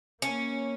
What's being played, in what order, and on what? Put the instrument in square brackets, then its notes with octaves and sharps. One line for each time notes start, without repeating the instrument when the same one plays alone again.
[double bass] A#3 [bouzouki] C#4